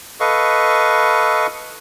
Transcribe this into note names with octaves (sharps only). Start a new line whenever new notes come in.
A4 B4 D#5 F5 C#6